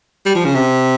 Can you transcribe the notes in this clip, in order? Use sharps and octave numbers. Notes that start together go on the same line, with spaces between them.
G3
F3
C#3
C3